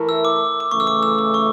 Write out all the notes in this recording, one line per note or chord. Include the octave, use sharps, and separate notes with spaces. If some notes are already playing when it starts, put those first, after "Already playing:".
Already playing: E3 A3 E4 A#4
E6
D6
D6
C#3 E3 A3 C#6
E6
D6
E6
D6
C#6